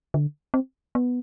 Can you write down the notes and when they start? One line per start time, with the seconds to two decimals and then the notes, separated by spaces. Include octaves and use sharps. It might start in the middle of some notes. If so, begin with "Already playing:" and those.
0.14 D3
0.54 C4
0.95 B3